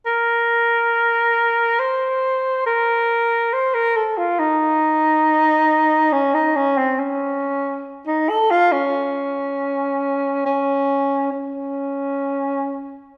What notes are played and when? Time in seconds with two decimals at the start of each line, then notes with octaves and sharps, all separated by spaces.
0.06 A#4
1.80 C5
2.66 A#4
3.53 C5
3.74 A#4
3.97 A4
4.18 F4
4.40 D#4
6.13 C#4
6.34 D#4
6.56 C#4
6.78 C4
6.99 C#4
8.07 D#4
8.29 A4
8.51 F4
8.72 C#4
10.46 C#4
11.32 C#4